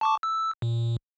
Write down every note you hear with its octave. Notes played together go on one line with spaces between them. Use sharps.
A5 C#6 D6
E6
A#2